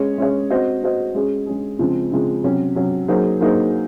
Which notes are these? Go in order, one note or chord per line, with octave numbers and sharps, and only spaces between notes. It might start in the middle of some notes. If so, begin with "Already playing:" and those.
Already playing: G#3 C#4 G#4 C#5
G#3 C#4 G#4 C#5
C4 F#4 C5 D#5
C4 F#4 C5 D#5
G#3 C#4 G#4
G#3 C#4 G#4
C#3 F3 G#3 C4
C#3 F3 G#3 C4
C3 F#3 C#4
C3 F#3 C#4
F#3 A#3 D#4 G#4 C5
F#3 A#3 D#4 G#4 C5